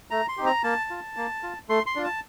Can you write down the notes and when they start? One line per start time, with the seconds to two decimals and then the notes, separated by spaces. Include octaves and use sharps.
0.11 A3 A#5
0.29 C6
0.37 C4 D#4 G4
0.46 A#5
0.63 A#3 A5
0.90 F4
1.17 A#3
1.43 F4
1.69 A3 C6
1.86 C6
1.96 D4 F4
2.04 A5